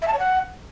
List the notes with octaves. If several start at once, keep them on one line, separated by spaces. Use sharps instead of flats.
E5
A5
C#5
F#5